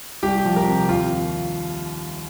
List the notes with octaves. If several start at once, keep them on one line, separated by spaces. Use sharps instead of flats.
C2 G4
F3
A#4
C3
D#2 F4